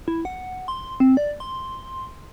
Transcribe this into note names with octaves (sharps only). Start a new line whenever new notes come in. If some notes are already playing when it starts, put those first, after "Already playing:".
E4
F#5
C6
C4
D5
C6